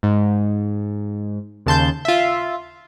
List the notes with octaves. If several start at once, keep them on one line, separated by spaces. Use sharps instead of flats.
G#2
D#2 C#3 A5 C6 G6
F4 E5